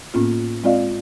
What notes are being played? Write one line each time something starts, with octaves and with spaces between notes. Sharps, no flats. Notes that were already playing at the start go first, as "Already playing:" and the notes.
A2 A#3 B3 C#4 F4
G#3 C4 F4 D5 D#5 F5